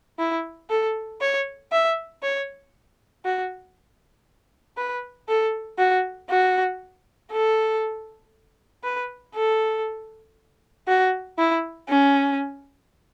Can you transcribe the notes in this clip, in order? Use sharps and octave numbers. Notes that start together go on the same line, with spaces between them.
E4
A4
C#5
E5
C#5
F#4
B4
A4
F#4
F#4
A4
B4
A4
F#4
E4
C#4